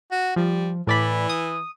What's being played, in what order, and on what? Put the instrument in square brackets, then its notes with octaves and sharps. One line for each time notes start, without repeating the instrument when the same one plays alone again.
[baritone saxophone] F#4
[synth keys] F3 [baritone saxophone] G3
[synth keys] A2 D5 B5 [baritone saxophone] E3
[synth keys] D#6